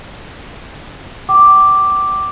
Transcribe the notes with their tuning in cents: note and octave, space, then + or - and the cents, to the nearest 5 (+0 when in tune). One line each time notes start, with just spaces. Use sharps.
G5 -40 D6 +0